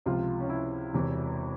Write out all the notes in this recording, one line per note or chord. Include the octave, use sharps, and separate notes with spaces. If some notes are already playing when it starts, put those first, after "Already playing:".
C#2 C3 F3 F4
C#4
E4
E1 E2 C3 E3